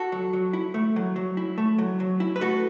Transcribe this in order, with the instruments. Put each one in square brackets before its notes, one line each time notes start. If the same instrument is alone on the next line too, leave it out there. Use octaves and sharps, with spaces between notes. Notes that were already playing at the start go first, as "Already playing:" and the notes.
Already playing: [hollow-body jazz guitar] F#4 A4
F#3
F#3
E4
A3
F#3
F#3
E4
A3
F#3
F#3
E4
B4
A3 F#4 A4